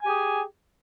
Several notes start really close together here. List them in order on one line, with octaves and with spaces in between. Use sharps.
G#5 G4 G#4